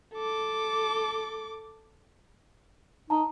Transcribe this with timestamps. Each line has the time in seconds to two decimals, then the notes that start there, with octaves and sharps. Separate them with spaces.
0.14 A4 D6
3.10 D#4 A5 A#5